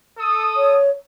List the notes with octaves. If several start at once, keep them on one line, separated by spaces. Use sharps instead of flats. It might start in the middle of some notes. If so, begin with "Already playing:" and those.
A4 D#6
C#5